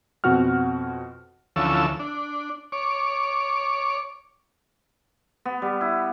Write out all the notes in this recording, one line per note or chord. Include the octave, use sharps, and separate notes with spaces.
F2 B2 C4 F#4 F#5 F6
D2 E3 F3 C#4 A4 E6
D4
C#5 D6
B3
G3
E4